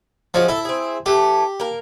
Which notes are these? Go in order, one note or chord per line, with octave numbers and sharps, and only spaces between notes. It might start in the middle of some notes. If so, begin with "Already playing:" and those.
F3 F#3 G#3 C#4
E4 A4
C4 G#4
E3 A3 G4
A#3 A#4